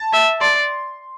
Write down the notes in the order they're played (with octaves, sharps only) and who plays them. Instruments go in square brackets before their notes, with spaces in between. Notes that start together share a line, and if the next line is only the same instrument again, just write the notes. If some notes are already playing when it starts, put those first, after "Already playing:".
Already playing: [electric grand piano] A5
[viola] E5
[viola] D5 [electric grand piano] C6